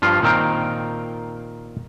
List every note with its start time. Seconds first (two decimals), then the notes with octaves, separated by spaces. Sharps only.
0.02 G2 F3 F4
0.22 A#2 D#3 C4 A#4 G5